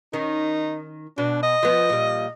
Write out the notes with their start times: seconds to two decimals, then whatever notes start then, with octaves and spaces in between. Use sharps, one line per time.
0.13 D#3 C#4 D#4
1.18 B2 D4
1.43 D#5
1.63 F3 B3
1.89 A#2 G3